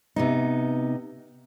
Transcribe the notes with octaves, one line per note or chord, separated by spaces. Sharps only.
C3 B3 D#4